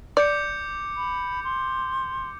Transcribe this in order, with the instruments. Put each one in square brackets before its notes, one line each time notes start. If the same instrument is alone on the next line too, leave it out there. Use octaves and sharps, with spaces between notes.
[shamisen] D5 [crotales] D6 G6 C#7
[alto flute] B5
C6